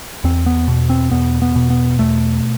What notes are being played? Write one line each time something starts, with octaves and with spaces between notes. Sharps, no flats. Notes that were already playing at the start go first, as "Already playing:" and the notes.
E2 C4
B3
B2
C4
E2 B3
B3
B2
B3
E2 A3